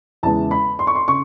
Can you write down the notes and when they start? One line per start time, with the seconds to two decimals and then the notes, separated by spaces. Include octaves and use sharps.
0.23 E2 C#3 E3 G#3 A5
0.51 B5
0.79 C6
0.87 C#6
0.95 C6
1.08 C#3 C#6